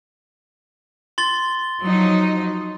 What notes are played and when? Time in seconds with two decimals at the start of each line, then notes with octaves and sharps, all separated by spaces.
1.18 C6 A6 G7
1.80 F3 F#3 D#4